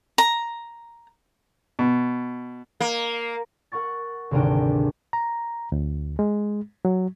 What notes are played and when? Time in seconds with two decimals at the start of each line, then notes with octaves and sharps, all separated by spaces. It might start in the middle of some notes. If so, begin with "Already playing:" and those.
0.18 A#5
1.79 B2
2.80 A#3
3.72 A#4 F#5 C#6 A6
4.31 G#1 D2 C3 D4 A#4 G5
5.13 A#5
5.72 D2
6.19 G#3
6.85 F#3